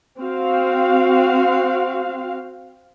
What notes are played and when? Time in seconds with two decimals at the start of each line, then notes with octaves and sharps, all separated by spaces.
0.20 C4 F#4 F5